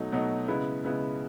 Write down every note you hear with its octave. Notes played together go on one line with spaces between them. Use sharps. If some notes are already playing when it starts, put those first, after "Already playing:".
Already playing: B2 F#3 A3 D#4
B2 F#3 A3 D#4
C#3 G#3 B3 E4
C#3 G#3 B3 E4